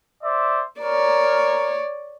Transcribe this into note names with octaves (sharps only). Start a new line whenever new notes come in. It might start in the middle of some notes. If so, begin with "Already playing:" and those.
C5 D5 E5
A#4 C#5 D5